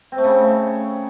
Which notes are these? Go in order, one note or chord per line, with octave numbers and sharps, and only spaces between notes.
C4
A3
C#3